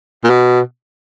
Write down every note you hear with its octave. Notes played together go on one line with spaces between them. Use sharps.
A#2
B2